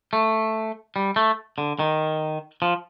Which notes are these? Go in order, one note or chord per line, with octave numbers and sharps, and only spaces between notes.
A3
G3
A3
D3
D#3
F3